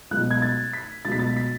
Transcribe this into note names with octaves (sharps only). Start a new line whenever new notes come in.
C#2 B2 F#3 F#6
G#6
A6
B6
C#2 B2 F#3 A6 B6
A6
B6